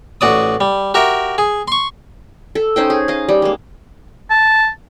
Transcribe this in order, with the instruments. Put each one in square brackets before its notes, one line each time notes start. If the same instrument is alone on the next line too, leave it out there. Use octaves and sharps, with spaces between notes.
[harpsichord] A1 F#4 D5 D#6
G3
F#4 G4 A#4 E5
G#4
C6 C#6
[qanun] A4
C#4 D#4 C5 G5
G#4
D#5 F5
G3
G#3 A#3
[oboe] A5